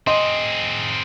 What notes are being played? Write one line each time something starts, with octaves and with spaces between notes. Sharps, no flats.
C4 G#4 D#5 C6